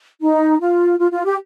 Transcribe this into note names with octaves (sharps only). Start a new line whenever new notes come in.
D#4
F4
F4
F4
G4